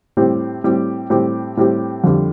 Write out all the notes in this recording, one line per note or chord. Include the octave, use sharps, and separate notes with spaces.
A2 G3 C4 G4
A2 G3 C4 G4
A2 G3 C4 G4
A2 G3 C4 G4
F2 D3 G3